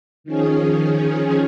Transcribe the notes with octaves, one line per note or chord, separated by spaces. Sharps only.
D#3 F3 C#4 G#4